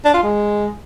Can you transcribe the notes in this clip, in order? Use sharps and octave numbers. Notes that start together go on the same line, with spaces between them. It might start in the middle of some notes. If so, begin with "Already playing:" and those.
D4
F4
G#3